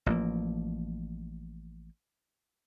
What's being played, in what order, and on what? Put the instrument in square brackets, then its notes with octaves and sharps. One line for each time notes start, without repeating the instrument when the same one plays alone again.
[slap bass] A1 F3 A#3